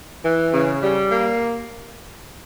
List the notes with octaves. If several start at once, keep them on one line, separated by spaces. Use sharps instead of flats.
E3
C#3
G3
A#3